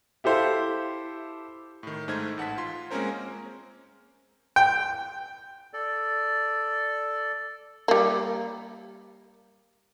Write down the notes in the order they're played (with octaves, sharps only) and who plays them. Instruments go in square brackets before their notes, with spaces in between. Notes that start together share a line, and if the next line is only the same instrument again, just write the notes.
[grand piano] E4 G4 A4 C5 E5 F5
[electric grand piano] A2 D#3
G#2 A3 D#4 C5 F6 G#6
A1 F#5 A5 B6
F4 C6
G#3 A#3 C4 C#4 A#4 C5
[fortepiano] G5
[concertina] A4 D5
[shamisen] G3 A#3